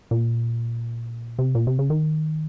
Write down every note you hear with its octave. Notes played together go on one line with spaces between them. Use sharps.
A#2
C3
A#2
C3
C#3
D#3